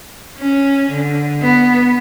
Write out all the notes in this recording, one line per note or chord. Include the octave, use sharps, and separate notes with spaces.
C#4
D3
B3